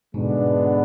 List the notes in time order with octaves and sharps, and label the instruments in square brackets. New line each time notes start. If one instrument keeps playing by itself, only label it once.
[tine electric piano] G#2 B2 [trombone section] D3 G#3 B3 D4